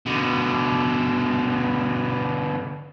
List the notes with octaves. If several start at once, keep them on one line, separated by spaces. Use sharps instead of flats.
B2 D3